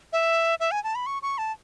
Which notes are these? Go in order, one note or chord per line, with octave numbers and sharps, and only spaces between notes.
E5
E5
G#5
A5
B5
C#6
C#6
A5